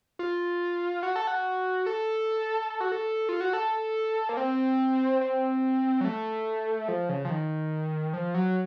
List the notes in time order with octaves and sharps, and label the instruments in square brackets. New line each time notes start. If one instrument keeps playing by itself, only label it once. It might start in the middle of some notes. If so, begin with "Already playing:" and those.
[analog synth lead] F4
F#4
A4
F#4
A4
A4
F#4
A4
F4
F#4
A4
A#3
C4
C4
F#3
A3
F3
C#3
F3
D#3
F3
F#3